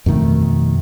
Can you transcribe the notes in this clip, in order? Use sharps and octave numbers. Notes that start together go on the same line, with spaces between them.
F2 B2 D#3 A3